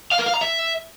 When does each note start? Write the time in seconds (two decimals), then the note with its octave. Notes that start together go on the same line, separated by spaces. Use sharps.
0.12 F5
0.19 A#4
0.26 F5
0.34 A#5
0.41 E5